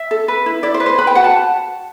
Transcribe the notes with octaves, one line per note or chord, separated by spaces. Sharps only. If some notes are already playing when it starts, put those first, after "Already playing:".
Already playing: E5
A4
B4
E4
E4 D5
C5
B4
C5
B4 B5
G5
F#4 F#5
A5